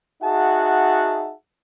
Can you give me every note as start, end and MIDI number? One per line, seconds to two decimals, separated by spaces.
0.23 1.32 63
0.23 1.32 66
0.23 1.32 68
0.23 1.32 76
0.23 1.32 78
0.23 1.32 81